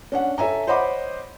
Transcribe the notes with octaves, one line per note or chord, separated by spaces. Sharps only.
C#4 D4 F#5
A4 C#5 E5 G#5 A#5
C5 C#5 D#5 F#5 B5 D6